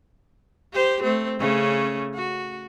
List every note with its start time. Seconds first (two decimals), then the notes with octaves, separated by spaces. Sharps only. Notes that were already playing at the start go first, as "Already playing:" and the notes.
0.74 G4 C5
1.03 A3 C4
1.39 C#3 A3 C#4
2.15 F#4